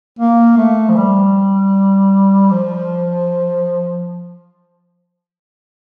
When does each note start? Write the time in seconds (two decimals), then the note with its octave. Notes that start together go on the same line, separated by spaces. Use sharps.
0.19 A#3
0.57 A3
0.89 F3
0.96 G3
2.51 F3